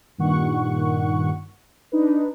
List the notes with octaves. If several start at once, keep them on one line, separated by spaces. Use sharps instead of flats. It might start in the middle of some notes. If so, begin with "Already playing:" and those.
G2 A#2 D#3 F#5 C#6
D4 D#4 B4